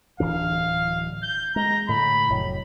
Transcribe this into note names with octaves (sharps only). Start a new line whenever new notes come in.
D1 E3 D4 F5
G6
G#3 A#5
A2 D3 B5
F1 A2 F#3